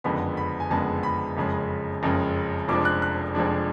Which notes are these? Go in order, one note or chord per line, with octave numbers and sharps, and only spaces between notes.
F#1 F2 D3 G#3 B3 B5
B5
G#5
F#1 F2 D3 G#3 B3 A5
B5
F#1 F2 C#3 G#3
F#1 F2 C#3 G#3
F1 F2 F3 G#3 D4 D6
F#6
F#6
F1 F2 F3 G#3 D4